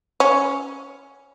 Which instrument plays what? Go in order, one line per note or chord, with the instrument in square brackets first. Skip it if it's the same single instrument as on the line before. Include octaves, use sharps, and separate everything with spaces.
[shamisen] C#4